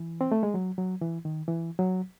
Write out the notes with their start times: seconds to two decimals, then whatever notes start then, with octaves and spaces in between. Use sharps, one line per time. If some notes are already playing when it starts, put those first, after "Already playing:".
Already playing: E3
0.21 C4
0.32 A3
0.43 G#3
0.54 F#3
0.78 F#3
1.01 E3
1.25 D#3
1.48 E3
1.79 F#3